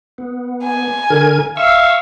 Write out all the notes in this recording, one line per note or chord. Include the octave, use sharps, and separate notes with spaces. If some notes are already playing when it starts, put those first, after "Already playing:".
B3
G#5
D3 A#4 G#6
E5 F5 C#6 E6